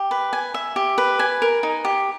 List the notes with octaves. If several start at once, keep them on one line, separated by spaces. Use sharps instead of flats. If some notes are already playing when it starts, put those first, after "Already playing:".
Already playing: G4
B4
G#5
E5
G4
B4
G#5
A#4
D#4
G4